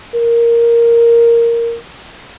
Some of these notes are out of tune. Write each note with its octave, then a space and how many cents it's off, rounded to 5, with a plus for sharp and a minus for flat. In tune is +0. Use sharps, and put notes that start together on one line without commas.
A#4 +0